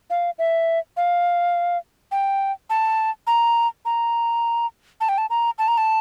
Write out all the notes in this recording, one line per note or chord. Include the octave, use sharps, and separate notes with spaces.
F5
E5
F5
G5
A5
A#5
A#5
A5
G5
A5
A#5
A5
A#5
A5